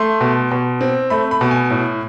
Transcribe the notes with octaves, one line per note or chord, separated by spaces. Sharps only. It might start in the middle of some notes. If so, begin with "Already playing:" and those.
Already playing: A3 C6
B2
B2
C4
A3 B5
B5
B2
G#5
A2